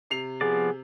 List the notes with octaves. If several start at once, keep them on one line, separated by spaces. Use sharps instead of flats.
C3 C7 F7
F3 B3 G#4 D5